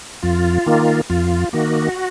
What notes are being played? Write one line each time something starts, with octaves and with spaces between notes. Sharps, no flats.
F2 F4
D#3 A#3
F2 F4
D#3 A#3 F#4